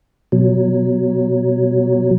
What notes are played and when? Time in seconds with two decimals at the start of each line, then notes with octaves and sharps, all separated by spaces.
0.32 B2 F#3